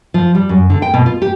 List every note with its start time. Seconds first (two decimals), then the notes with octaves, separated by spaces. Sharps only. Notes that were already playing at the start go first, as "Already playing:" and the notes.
0.14 F3
0.35 G3
0.49 F#2
0.70 D3
0.82 G5
0.94 B2
1.06 F4
1.22 G4